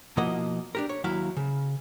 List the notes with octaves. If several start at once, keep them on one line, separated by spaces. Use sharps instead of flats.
B2 F3 A#3 E4 D#5 F#5
D4 G4 A#4
C#5
D#2 F#3 E4 F5
C#3